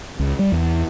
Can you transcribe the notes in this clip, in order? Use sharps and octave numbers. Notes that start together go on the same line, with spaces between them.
C#2
G3
E2